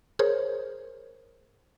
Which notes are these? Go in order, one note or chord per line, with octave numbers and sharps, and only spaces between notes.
G#4 A#4 C5 C#5